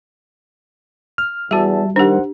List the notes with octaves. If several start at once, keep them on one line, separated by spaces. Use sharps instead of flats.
F6
E2 G3 F#4 G#4 E5 A5
D#3 D4 G4 C5 F#5